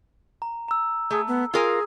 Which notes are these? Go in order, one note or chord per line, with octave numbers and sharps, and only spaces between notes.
A#5
A#5 E6
A3 G#4
B3
F4 G#4 A#4 G#5